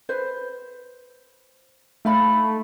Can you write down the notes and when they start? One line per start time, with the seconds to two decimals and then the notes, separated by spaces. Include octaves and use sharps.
0.09 B4 C5
2.05 A3 D#4 F5 B5